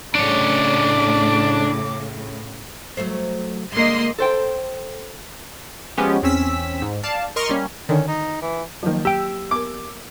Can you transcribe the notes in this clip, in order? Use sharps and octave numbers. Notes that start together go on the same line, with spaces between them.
A2 C#3 D4 C#5 D6
F#3 A3 C5
D3 G#3 A#3 D#5 C6
A4 C5 G5
F3 G#3 B3 C#4 G4
E2 C4 C#4 E6 B6
G#2
D5 F5 A5
A#4 D#5 C6 C#6 F6
G3 A#3 C#4
D3 D#3 C#4
D#4
E3
D#3 F3 F#3 A#3
G4 G5 E6
B3 A#4 D6